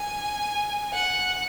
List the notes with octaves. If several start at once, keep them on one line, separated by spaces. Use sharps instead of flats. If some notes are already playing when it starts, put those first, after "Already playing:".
Already playing: G#5
F#5